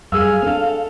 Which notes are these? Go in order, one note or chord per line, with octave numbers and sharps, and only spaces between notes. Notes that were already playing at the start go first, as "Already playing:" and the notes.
F#2 G3 G#4 F5 E6
C4 D4 A4